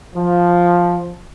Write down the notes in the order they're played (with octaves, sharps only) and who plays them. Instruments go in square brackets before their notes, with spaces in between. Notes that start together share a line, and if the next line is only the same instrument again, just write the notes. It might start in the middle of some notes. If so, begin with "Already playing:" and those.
[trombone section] F3